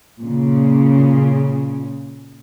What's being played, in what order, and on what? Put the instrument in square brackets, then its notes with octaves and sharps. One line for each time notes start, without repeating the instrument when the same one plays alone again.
[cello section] A#2 C#3